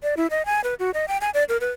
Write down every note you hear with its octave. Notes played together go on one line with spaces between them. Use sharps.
D5
E4
D#5
G#5
B4
F#4
D#5
G5
G#5
D5
A#4
B4